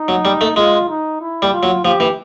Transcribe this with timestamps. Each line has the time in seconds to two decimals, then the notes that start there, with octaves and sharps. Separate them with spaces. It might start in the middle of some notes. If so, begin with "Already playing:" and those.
Already playing: D#4
0.08 F#3
0.25 G3
0.41 A3
0.56 G#3 F4
0.89 D#4
1.21 E4
1.42 G3
1.52 F4
1.63 F#3
1.84 F3 G4
2.00 E3